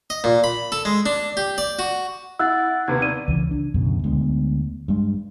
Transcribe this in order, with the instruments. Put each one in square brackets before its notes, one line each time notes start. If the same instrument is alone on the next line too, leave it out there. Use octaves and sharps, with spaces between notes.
[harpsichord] D#5
A#2
B5
A4
G#3
D4
G4
D5
F#4
[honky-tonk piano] E4 [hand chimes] F#5 F#6 A6 [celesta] E6
[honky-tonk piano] D#2 C3 B3 [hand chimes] G#6
[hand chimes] D5 [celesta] D#7
[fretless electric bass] C#2 E3
D4
C#2 F#2 B2 D3
D2 G#3 B3
G2 G#3